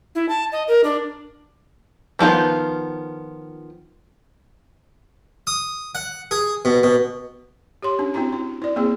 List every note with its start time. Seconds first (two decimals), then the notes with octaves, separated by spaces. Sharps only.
0.15 E4
0.29 A5
0.52 D#5
0.68 A#4
0.84 D4
2.19 D#3 F3 B3 F4
5.47 D#6
5.95 F#5
6.31 G#4
6.65 B2
6.83 B2
7.82 G4 C#5 C6
7.99 C#4 D4
8.14 C4 D4 E4 F#4 A#5
8.32 E4
8.62 E4 D5
8.76 A#3 C4 E4 G#4